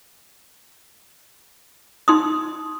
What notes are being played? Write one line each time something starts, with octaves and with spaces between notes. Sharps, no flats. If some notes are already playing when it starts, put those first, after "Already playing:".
D#4 C6 D#6